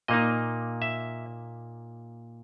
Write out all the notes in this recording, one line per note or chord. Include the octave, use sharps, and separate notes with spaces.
A#2 A#3 D#4 D#5
E5